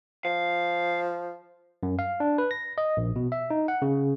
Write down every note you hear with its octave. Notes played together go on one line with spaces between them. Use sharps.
F3 F5
F#2
F5
D4
B4
A#6
D#5
A#1
B2
E5
D#4
F#5
C#3